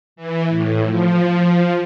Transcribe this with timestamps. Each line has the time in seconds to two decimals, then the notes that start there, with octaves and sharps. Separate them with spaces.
0.16 E3
0.48 A2
0.85 F3